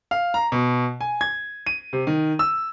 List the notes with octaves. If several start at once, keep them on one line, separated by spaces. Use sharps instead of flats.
F5
A#5
B2
G#5
G#6
D#7
C3
D#3
E6